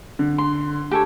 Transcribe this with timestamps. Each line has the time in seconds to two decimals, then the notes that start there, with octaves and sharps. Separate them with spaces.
0.19 D3
0.38 C6
0.91 G4 A4 C#5